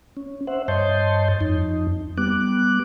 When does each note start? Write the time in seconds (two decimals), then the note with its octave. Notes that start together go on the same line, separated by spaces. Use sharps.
0.17 C#4
0.47 C5 E5 F#5
0.68 G2 C#5 D#5 A5 C6 G6
1.41 F2 D#4
2.18 G3 B3 D6 F#6